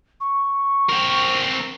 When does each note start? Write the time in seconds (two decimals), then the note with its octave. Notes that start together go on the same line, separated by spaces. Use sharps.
0.21 C#6
0.89 C4 A#4